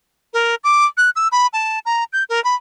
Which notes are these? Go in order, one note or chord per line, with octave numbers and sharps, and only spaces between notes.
A#4
D6
F#6
E6
B5
A5
A#5
G6
A#4
B5